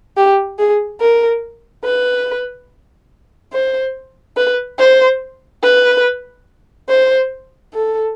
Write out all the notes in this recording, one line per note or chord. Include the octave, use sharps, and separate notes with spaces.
G4
G#4
A#4
B4
C5
B4
C5
B4
C5
A4